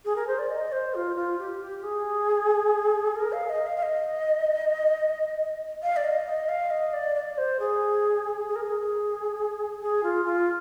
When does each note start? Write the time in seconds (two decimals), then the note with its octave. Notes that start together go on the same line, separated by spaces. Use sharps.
0.05 G#4
0.16 A#4
0.27 C5
0.39 D5
0.50 D#5
0.72 C5
0.95 F4
1.16 F4
1.39 G4
1.61 G4
1.83 G#4
3.16 A#4
3.33 F5
3.50 D#5
3.66 F5
3.77 F5
3.83 D#5
5.83 F5
5.96 D5
6.04 D#5
6.27 D#5
6.49 F5
6.71 D#5
6.93 D5
7.15 D5
7.38 C5
7.60 G#4
8.48 G#4
8.56 A#4
8.64 G#4
9.81 G#4
10.03 F4
10.26 F4